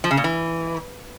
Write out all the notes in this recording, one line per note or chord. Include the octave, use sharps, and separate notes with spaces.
F3
C#3
A#2
E3